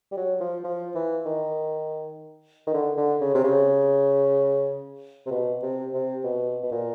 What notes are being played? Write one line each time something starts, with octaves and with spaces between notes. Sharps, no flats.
G3
F#3
F3
F3
E3
D#3
D#3
D3
D3
C#3
C3
C#3
C3
B2
C3
C3
B2
B2
A#2